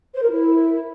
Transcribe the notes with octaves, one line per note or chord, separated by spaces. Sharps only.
C5
A#4
E4